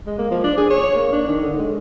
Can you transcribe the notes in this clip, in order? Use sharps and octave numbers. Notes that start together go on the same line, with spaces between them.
G#3
A#3
F3
D4
G#4
C#5
A#3
D4
D#3
D3
G#3